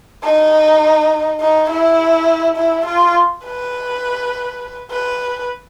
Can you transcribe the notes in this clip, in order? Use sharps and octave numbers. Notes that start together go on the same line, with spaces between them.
D#4
D#4
E4
E4
F4
B4
B4